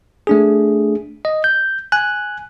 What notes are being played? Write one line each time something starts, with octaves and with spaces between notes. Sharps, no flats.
A3 D4 G#4
D#5
G6
G#5 F#6